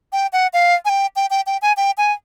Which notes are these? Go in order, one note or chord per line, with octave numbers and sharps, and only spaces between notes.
G5
F#5
F5
G#5
G5
G5
G5
G5
G#5
G5
G#5